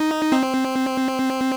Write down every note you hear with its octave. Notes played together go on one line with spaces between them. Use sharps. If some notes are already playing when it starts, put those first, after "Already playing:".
Already playing: D#4
C4